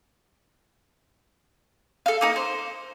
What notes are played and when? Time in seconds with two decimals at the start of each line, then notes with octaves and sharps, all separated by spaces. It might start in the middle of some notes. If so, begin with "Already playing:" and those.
2.06 A4 F5
2.21 A#3 D#4 D#6
2.36 C5